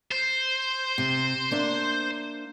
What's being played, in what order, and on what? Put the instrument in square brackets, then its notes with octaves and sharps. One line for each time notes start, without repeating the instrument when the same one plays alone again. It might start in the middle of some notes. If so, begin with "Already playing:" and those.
[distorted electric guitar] C5
[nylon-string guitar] C3
A#3 D4 E5